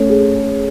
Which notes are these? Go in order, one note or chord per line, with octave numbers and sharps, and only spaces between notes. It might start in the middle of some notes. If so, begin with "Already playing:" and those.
Already playing: A3 C#4
G#4